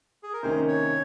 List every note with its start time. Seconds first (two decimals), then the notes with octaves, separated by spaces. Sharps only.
0.23 G#4
0.33 A#4
0.42 C2 C3 D#3 A#3 C#4 C5
0.68 C#5